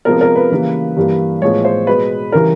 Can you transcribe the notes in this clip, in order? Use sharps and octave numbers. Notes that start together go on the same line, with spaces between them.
C3 F3 G#3 B3 A#4
A#4
B4
C#3 E3 G3 A#3
G2 E3 G3 A#3
A2 F3 G#3 B3 C#5
C5
B2 G#3 B3 B4
C#3 E3 G3 A#4